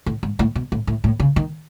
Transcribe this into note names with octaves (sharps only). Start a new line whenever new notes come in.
A2
G#2
A2
B2
A2
A2
A2
C#3
D#3